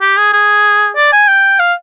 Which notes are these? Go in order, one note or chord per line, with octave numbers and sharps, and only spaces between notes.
G4
G#4
G#4
D5
G#5
G5
F5